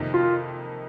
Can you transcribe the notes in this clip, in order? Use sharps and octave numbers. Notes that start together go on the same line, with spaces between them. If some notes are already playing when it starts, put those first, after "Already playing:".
Already playing: F2 C3 D#3 A#3 D#4
F4